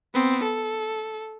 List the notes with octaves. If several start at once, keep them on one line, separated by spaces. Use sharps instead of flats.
B3 C4
A4